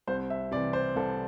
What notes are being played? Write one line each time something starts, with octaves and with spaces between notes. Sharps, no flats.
C2 C5
E5
C3 E3 D5
C5
C2 A4